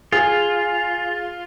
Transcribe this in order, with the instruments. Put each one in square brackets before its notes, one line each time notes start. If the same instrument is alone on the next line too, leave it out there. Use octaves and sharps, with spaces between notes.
[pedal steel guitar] F4 [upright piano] G#4